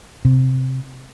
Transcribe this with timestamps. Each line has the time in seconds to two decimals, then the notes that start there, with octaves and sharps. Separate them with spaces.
0.25 C3